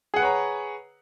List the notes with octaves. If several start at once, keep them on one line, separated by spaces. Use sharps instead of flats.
G#4 B4 C#5 F#5 A#5